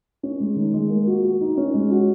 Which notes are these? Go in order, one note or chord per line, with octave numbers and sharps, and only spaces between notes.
C#4
G#3
D#3
G#3
A#3
F#4
F#4
D#4
C#4
G#3
F#4